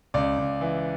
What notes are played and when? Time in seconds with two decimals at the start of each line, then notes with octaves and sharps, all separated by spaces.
0.14 C#2 D5
0.38 C#2
0.61 E3